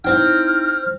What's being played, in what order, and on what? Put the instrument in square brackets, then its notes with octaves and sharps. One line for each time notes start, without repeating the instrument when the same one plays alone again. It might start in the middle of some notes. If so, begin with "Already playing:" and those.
[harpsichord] C4 G5 [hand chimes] D#4 E4 [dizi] F6